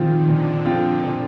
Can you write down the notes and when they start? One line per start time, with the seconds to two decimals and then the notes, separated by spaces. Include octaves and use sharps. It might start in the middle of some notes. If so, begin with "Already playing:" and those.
Already playing: A#2 D#3 F3 C4 F4
0.28 A#2 D3
0.65 F3 C4 F4
1.03 A#2